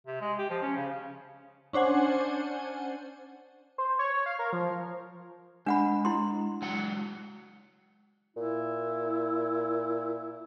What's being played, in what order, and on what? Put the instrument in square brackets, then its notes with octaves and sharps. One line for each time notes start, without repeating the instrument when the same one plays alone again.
[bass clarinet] C3
G#3
G4
F3
C#4
C#3
[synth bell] C#4 D4 C5 F#5 G#5
[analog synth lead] C5
C#5
F5
A#4
F3
[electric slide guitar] G#3 [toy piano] D4 F#5 B5
[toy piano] E4 C6
[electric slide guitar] F#3 G#3 F#5
[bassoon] A#2 [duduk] E4